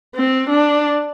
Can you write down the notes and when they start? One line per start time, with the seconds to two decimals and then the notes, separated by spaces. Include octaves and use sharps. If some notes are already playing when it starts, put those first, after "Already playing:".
0.15 C4
0.50 D4